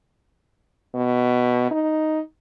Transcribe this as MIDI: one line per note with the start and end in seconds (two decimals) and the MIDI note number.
0.94 1.71 47
1.71 2.20 63